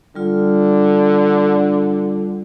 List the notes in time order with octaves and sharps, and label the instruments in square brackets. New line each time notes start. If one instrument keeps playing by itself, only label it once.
[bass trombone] D3 [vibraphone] G3 F4